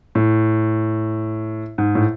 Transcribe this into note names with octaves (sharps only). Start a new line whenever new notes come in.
A2
G#2
A2